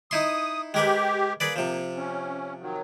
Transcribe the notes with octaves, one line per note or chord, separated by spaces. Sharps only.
D#4 E4 C6 D#6
G#3 G4 A#4 B4
A#3 G#4 B4 D5
C3 F3
C#4
D#3 F#3